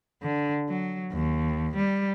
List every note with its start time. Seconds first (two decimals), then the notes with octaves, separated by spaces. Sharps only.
0.23 D3
0.69 F#3
1.13 D#2
1.76 G3